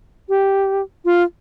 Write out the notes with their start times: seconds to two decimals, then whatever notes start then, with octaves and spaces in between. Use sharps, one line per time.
0.29 G4
1.05 F4